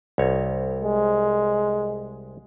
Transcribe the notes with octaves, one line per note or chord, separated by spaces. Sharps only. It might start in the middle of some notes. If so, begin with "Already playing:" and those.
C2 C#5
G#3